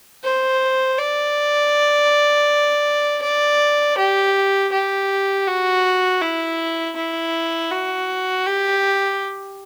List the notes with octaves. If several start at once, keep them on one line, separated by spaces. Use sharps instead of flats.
C5
D5
D5
G4
G4
F#4
E4
E4
F#4
G4